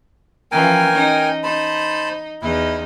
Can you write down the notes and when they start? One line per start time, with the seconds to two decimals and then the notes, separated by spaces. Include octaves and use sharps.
0.52 E3 F3 C#4 A#4 G5 G#5
0.90 C#4 D#4
1.43 D#4 C5 A5 B5
2.42 E2 D#4 E4